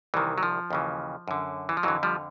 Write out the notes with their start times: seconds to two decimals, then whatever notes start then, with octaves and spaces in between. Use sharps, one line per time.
0.14 C2 C3 D#3 E3
0.38 F#3
0.43 F3
0.71 D#2 C#3 E3
1.28 F#2 D3
1.69 E3
1.77 F3
1.83 F2 D3 E3 F#3
2.03 F3 G3